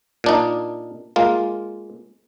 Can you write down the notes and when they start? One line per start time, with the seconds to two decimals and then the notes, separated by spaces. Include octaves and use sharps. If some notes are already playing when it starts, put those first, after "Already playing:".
0.24 A#2 D4 D#4
1.16 G#3 A#3 F4